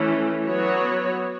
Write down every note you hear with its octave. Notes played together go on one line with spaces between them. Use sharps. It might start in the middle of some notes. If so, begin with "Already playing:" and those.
Already playing: E3 A3 C#4
F#3 B3 F#4 C#5